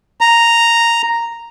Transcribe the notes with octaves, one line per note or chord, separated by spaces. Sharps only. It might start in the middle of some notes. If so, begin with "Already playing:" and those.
A#5